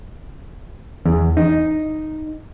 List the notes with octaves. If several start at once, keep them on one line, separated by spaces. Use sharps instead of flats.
E2
D#4